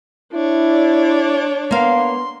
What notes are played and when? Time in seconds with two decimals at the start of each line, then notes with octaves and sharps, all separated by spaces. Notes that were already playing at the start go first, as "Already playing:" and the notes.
0.33 D4 E4 C#5
0.69 D5
1.71 A#3 B3 F5 C6